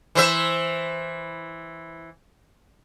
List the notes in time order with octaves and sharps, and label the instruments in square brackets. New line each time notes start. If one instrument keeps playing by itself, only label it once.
[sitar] E3 C5 E5